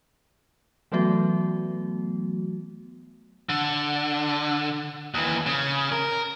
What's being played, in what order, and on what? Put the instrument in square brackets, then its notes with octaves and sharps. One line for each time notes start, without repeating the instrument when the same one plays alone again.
[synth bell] E3 F#3 A3 B3 F#4
[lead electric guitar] D3
D#2 E3
C#3
A#4